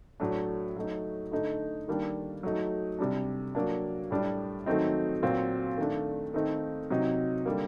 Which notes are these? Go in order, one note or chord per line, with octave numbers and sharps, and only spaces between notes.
A2 F#3 A3 D4
F#3 A3 D#4
D3 A3 D#4
D#3 G3 A#3 D4
F#3 A3 D#4
C3 G3 D4
F#3 A#3 D4
A2 G3 D4
D#3 F#3 A3 C4 D#4
A#2 F#3 C4
D#3 A3 D4
D#3 A3 C4 D#4
C3 F#3 C4 D#4
D3 G3 A#3